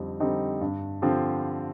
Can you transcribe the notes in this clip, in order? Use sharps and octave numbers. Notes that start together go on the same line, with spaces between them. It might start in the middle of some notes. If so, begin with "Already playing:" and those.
Already playing: F2 D3 G3 C4 D#4
D3 G3 C4 D#4
G2
D3 F3 C4 G4